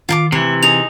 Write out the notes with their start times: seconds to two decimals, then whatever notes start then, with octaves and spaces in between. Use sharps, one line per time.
0.09 D#3 F4 A5 D6
0.32 C3 E3 A3 E5
0.63 D#4 G#4 F7